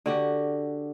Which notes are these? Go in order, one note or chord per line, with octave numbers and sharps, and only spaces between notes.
D3 F#4 G4